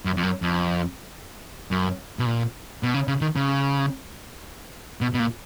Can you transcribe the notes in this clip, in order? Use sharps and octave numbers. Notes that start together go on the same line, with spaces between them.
F#2
F2
F#2
F2
F#2
B2
A#2
B2
C#3
C#3
D#3
C#3
B2
B2
A#2